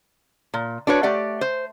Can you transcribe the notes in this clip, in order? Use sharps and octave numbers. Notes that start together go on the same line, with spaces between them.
A#2
D4 F#4 B4 C#5
A3 G4 D5 F#5
C5